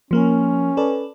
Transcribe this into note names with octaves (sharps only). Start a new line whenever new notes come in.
F3 A#3 C#4 A#4
A4 B4 D5